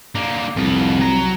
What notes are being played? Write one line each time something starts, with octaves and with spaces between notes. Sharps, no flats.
D3 A#3
C2 F2 B3
F#3 A#5